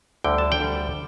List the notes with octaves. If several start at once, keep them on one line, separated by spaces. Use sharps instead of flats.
D2 D3 G3 G5
A5
G5
D2 D3 G3